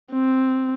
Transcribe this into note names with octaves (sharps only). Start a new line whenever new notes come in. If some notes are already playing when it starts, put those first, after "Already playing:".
C4